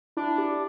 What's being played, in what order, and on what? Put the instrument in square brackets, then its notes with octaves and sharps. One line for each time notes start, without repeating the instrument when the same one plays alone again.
[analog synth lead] D4 [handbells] E4
[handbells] G4